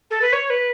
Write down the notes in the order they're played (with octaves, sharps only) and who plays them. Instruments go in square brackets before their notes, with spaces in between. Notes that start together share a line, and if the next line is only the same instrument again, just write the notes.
[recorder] A4
B4
C#5
B4